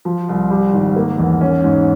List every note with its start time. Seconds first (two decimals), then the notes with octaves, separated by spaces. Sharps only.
0.05 F3
0.28 C2
0.50 G3
0.73 G#1
0.96 A#3
1.19 E2
1.41 C#4
1.64 G#2